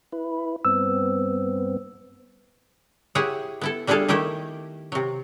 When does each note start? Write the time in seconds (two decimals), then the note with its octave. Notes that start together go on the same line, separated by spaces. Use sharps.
0.12 E4 B4
0.65 G2 B3 C4 E6
3.15 E4 G4 G#4 C#5 E5 F#5
3.61 B3 E4 A4
3.87 G3 D4 E4 G#4 A4 F5
4.08 D#3 A3 E4 G4 G5
4.92 C3 F#3